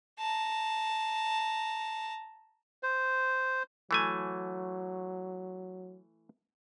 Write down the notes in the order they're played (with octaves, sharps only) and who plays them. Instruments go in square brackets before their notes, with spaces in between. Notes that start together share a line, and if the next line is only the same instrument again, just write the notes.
[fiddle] A5 A#5
[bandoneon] C5
[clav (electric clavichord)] E3 A3 G#5 [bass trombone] F#3